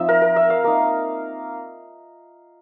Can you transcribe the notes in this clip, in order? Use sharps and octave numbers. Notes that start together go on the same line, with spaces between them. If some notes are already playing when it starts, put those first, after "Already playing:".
Already playing: F3 C4 D#4 E5
A#4
A#4
E5
F5
A#3 D#4